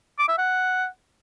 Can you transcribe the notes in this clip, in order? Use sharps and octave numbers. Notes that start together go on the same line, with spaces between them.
D6
E5
F#5